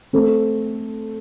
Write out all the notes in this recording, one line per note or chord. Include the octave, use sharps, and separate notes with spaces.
A3 C4